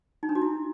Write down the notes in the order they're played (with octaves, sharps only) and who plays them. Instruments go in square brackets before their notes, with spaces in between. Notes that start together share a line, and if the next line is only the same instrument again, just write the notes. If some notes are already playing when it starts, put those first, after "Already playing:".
[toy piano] D#4
D4
F#4
E4